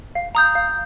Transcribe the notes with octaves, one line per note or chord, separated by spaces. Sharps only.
F5
A#5 D#6 G6
F5